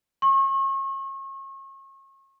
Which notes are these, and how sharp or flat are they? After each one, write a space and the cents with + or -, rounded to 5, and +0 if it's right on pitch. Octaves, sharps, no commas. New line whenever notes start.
C#6 -35